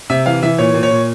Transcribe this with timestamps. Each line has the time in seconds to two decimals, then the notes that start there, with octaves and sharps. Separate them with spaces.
0.10 C3 E5
0.26 E3 F5
0.43 E3 E5
0.58 A#2 C#5
0.74 A#2
0.83 C#5
0.91 A#2